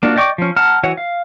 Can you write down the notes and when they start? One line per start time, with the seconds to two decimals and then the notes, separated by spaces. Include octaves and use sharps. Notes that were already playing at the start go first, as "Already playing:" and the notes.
0.03 A#3 D4 F4 F#4
0.16 D5 D#5 G5 C#6 D6
0.38 F3 C#4
0.56 F#5 A5 A#5 F6
0.83 E3 F#4 C#5 F#5
0.97 F5